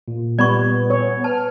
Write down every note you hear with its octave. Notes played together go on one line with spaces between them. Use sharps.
A#2
G3 B3 D5 B5 C#6
C#5
B4 A5 F6